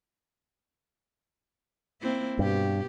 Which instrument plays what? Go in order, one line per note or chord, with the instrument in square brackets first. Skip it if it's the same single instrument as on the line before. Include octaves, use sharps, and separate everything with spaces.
[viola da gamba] A#3 C4 E4
[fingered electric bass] G2 [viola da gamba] B2 G4